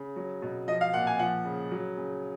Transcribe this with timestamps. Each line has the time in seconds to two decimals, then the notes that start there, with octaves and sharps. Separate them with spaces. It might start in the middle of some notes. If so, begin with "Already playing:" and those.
Already playing: C#3
0.16 F#3
0.42 B2
0.68 F3 D#5
0.81 F5
0.93 A#2 F#5
1.07 G#5
1.19 F3 F#5
1.45 C#3
1.71 F#3
1.97 C#3